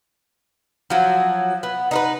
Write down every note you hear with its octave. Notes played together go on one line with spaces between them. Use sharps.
F3 F#3
B3
D#4 A#4 B4